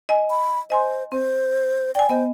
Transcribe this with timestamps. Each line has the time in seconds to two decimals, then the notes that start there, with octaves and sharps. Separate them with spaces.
0.09 D#5 G#5
0.30 B5
0.70 C5 D#5 G#5 C6
1.12 C4 C5
1.95 D5 G5 G#5
2.09 B3 C5 D#5